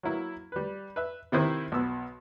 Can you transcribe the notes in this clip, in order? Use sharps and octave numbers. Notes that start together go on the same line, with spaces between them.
F#3 A#3 E4
G3 B4
B4 E5
C3 D#3 E4 C5 D#6
B1 B3 E6